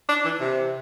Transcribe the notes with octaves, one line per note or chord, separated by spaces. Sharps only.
D4
E3
C3